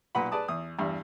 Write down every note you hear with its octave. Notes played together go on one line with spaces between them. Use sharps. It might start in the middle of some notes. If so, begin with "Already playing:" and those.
B1 A#2 B4 F#5 B5
G#4 B4 D5 A5 D#6
E2 D#6
E2 G2